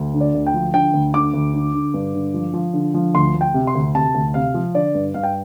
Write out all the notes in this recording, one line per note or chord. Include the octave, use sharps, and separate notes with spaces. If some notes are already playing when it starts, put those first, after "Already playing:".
Already playing: D2
D3
D5
D2
G5
F3
D3 G5
D2
D3 D6
D2
D3
D3
G2
D3
F3
F3
D3
F3
D2 C6
D2
G5
C3
C6
D2
C3 A5
D2
C3 F5
F3
D3 D5
G2
G2 F5
G5